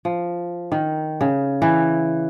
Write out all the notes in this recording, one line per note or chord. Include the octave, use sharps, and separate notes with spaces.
F3
D#3
C#3
E3